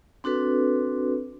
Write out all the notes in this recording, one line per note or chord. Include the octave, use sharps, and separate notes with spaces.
C4 D4 F#4 A4 B4